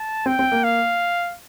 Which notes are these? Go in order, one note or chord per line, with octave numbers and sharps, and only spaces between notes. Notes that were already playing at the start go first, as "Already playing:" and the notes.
Already playing: A5
C4 G5
C4
A#3
F5